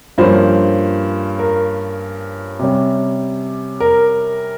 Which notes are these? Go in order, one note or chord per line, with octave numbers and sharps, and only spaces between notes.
G2 F3 A#3 C#4 C5
A#4
C3 G3 C#4
A#4